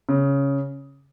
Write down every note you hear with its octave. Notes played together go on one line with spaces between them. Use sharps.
C#3